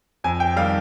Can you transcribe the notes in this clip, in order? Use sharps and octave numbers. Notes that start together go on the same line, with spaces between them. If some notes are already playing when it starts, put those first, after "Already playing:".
F2 G#5
G5
D#3 G3 F5